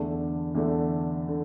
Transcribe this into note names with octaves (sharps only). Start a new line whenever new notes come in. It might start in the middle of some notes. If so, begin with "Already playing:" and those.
Already playing: E2 D3 A3 D4
E2 D3 A3 D4
D3